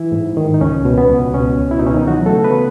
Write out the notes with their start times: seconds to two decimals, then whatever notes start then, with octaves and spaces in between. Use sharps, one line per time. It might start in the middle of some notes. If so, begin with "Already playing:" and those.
Already playing: E3 E4
0.12 G#2
0.37 D#3
0.54 D#4
0.61 C#2 C#4
0.85 B2
0.98 B3
1.10 C#2
1.34 B2 C#4
1.58 C#2
1.71 E4
1.79 D#4
1.83 B2 C#4
1.94 D#3 D#4
2.08 E3 F#3 F#4
2.26 A3 A4
2.33 C#3
2.44 B3 B4